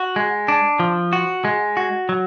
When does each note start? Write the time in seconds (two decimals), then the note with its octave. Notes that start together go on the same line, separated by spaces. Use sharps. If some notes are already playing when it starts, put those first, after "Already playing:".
Already playing: F#4
0.16 G#3
0.48 D4
0.80 F3
1.13 F#4
1.45 G#3
1.77 F#4
2.09 F#3